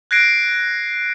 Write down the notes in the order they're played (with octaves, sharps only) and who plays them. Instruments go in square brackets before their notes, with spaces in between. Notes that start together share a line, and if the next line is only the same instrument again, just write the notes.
[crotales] F#6 G#6 A#6 C7 D7